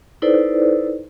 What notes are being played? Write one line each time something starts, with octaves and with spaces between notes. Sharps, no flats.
D#4 E4 A4 B4 C5 D5